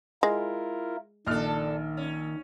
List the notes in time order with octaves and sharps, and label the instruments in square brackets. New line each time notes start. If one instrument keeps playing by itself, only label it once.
[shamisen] G#3 [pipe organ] E4 F4 A#4
[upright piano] A#1 F6 [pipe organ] D#3 [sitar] D4 A4
[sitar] C#4